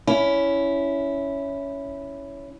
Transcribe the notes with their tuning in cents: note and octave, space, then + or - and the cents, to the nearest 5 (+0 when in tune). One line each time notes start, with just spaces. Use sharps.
C#4 +15 E4 +0